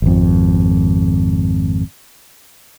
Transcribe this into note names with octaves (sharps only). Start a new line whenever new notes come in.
G#1 F2